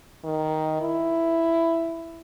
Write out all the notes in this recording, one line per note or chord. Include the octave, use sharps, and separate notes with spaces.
D#3
E4